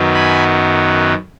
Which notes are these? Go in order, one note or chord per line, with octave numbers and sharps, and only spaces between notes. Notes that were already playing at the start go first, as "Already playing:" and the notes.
Already playing: F#2 D#3 F#3 B3
G#5 B5